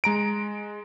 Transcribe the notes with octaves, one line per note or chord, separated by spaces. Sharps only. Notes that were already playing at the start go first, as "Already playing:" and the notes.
G#3 A#5 D7